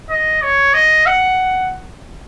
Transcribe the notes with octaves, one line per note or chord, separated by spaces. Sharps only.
D#5
C#5
D#5
F#5